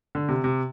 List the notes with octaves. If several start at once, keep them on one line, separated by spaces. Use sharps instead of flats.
D3
C3
C3